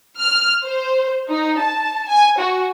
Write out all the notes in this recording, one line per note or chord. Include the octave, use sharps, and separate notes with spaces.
F6
C5
D#4
A5
G#5
F#4